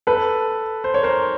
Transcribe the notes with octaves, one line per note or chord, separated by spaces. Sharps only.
A4 B4
C5
C#5
A#4 C5